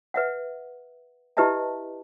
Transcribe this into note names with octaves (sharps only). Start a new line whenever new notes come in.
B4 E5 F#5
E4 G4 B4 D#5 E5 A5